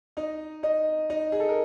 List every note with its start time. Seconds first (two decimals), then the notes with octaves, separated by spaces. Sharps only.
0.17 D#4 D#5
0.63 D#4 D#5
1.10 D#4 D#5
1.32 G#4
1.40 A4
1.49 A#4